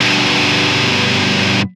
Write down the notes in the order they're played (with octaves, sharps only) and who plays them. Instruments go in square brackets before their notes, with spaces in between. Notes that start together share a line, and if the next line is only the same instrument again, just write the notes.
[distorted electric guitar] G2 B2